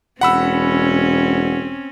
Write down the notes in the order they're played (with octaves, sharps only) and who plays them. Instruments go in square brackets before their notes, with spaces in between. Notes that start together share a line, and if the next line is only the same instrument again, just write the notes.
[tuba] E1 [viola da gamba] C4 C#4 [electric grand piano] F#5 B5 E6